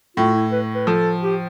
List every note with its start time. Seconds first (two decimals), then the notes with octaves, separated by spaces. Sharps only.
0.17 A2 F4
0.34 E4
0.51 B4
0.75 B4
0.87 F3 A4
1.23 G4